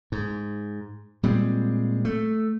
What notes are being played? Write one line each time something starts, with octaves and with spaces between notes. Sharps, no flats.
G#2
A#2 G3 G#3 C4
A3